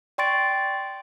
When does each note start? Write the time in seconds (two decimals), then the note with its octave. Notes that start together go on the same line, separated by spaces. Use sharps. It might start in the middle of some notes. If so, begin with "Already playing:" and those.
0.18 D5 G5 C6 C#6 A6 D7